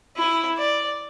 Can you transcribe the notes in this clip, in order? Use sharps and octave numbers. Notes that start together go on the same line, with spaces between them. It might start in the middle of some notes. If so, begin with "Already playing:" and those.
E4
D5